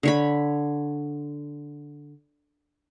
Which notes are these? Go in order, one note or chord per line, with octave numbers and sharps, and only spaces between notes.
D3 C#5 B5